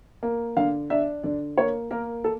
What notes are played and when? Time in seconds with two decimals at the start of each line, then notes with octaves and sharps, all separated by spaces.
0.23 A#3
0.57 D3 F5
0.90 D4 E5
1.23 D3 D5
1.58 A#3 C#5
1.91 A#3 A#4
2.24 A4